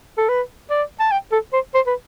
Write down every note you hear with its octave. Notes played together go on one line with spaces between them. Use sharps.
A4
B4
D5
A5
G5
A4
C5
C5
B4